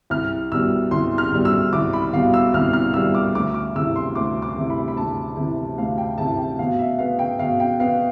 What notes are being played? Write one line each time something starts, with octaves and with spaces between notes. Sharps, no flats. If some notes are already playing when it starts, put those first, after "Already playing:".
C2 F6
B2 G3 E6
C2 C6
F6
B2 G3
E6
C2 D6
B5
B2 G3 F5
E6
C2 F6
F6
B2 G3 E6
D6
D2 D6
D6
C3 E3 E6
C6
D2 D6
D6
C3 E3
B5
B5
D2 A5
C3 E3
D2 F5
G5
C3 E3 A5
G5
B2 F5
E5
B3 F5
G5
B2 F5
G5
B3 F5